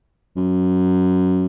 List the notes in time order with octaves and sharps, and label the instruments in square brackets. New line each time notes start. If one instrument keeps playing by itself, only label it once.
[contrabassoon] F#2